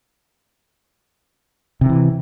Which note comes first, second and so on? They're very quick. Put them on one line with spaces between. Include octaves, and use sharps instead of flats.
C3 D#3 E3